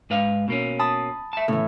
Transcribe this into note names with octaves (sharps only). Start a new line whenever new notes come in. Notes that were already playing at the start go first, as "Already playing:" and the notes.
G#2 B4 F5
B2 A#3 C#4
A5 B5 D#6
E5 A5
A2 C#3 E3